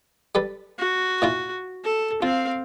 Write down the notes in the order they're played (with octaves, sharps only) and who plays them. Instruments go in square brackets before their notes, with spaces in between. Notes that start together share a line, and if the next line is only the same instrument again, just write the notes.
[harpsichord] G3 A4 B4
[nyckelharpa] F#4
[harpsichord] A#2 E4 F4
[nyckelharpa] A4
[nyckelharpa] C4 F5 [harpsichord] F4